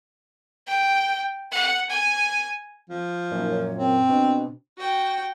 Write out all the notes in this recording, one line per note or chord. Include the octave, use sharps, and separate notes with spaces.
G5
F#5
G#5
F3
F#2 A#2 A#3 D#4
C#5
C4
B2 D4
F#4 G5